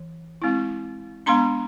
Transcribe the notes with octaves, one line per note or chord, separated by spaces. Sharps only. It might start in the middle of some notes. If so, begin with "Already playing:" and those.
Already playing: E3
G#3 C4 E4
G#3 B3 D4 A#5 C6